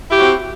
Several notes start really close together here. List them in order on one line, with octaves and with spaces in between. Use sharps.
E4 G4 F#4 C4